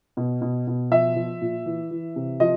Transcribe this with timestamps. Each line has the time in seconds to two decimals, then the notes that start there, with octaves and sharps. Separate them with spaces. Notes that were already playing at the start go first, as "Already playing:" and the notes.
0.17 B2
0.41 B2
0.67 B2
0.91 F3 E5
1.16 F3
1.41 A#2
1.66 E3
1.91 E3
2.16 C3
2.40 F3 D#5